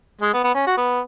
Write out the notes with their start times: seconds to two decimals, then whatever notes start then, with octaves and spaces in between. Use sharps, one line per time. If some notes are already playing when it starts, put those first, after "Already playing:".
0.21 G#3
0.34 B3
0.44 B3
0.54 C#4
0.67 F#4
0.77 B3